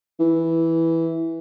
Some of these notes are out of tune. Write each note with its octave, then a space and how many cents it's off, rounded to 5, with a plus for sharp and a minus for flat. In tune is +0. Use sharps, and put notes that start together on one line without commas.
E3 -5